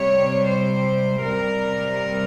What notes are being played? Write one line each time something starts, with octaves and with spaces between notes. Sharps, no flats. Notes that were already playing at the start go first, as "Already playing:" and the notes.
Already playing: C3 G3 C#5
C5
C3 G3 A#4